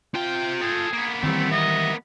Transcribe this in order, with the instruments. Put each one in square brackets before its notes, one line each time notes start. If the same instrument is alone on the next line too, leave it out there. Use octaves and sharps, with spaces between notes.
[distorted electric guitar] C3 G5 [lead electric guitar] F4
[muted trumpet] G#4 [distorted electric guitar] A4 G5
[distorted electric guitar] A#3 B3
[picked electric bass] D#3 E3 G3 [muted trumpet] A3 [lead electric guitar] C4
[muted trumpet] D#5 [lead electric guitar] E5